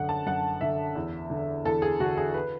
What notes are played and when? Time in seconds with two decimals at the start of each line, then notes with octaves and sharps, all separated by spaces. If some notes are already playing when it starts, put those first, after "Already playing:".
Already playing: F#2 D3 F#5
0.09 A5
0.26 F#2 F#5
0.61 D3 E5
0.95 E2
1.30 D3
1.65 E2 A4
1.82 G#4
1.99 D3 F#4
2.17 G#4
2.34 B4